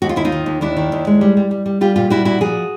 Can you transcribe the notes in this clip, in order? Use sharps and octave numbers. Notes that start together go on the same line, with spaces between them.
D#2 F#4
F4
D#2 E4
D#4 F4
D#3
D#2
D#2 D4 E4
D#3
D#2
G#3
G3
G3
G3
G3
G3 F4 G4
A#2 F4 G4
G3 E4 F#4
A#2 E4 F#4
F3 F#4 G#4